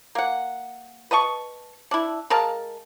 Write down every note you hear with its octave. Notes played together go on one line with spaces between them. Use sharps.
A#3 F#5
B4 D#5 A5 C#6
D4 E4
G#3 A#4 F5 A5